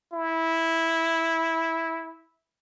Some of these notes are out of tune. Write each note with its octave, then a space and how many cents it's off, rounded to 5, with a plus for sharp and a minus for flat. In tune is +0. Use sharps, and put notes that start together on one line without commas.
E4 -10